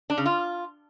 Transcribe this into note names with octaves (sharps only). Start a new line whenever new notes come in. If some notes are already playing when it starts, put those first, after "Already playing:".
D4
C#3
F4